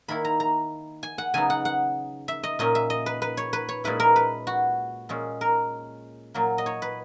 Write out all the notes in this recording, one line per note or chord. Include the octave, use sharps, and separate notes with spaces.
D#3 A#3 E4 B5
A#5
A#5
G#5
F#5
C#3 F#3 B3 D#4 G#5
F#5
F#5
E5
D#5
A#2 A#3 C#4 D#5
E5
D#5
B4
B4
C#5
B4
C#5
A#2 G#3 C#4 E4 B4
A#4
B4
F#4
A#2 G#3 C#4
A#4
A#2 F#3 A#3
D#5
C#5
B4